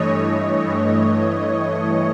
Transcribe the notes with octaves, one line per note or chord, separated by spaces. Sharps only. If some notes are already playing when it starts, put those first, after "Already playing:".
Already playing: G2 E3 A3 C#5 D#5
G2 E3 A3